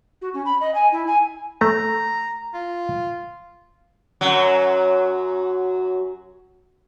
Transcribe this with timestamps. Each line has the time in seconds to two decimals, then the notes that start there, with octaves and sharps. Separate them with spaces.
0.22 F#4
0.34 C#4
0.46 B5
0.61 D#5
0.75 G#5
0.92 E4
1.07 G#5
1.61 A3 A#5
2.54 F4
4.21 F#2 F#3